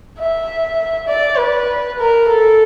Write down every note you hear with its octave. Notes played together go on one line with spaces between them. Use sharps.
E5
D5
B4
A#4
A4